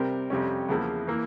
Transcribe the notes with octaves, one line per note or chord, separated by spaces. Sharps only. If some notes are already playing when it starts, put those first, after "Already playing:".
Already playing: C3 G3 C4 G4 A#4
F2 C3 G3 C#4
E2 C#3 F3 A#3 E4
E3 A#3 E4